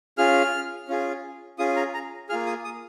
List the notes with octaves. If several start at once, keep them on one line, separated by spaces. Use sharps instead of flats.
C#4 F4 G#4 F6
C#4 F4 G#4
C#4 F4 G#4 D#6
A#5
A#5
A#3 F4 G#4 F6
D#6
D#6